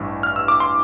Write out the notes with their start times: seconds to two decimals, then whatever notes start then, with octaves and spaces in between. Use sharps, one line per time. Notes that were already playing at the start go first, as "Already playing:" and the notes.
Already playing: A1 G2 E3
0.23 F6
0.36 E6
0.48 D6
0.60 C6